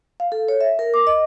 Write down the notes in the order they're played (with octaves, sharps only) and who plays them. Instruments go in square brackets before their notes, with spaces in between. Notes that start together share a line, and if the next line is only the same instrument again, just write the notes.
[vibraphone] F5
A4
C#5
E5
A#4
D6
D#5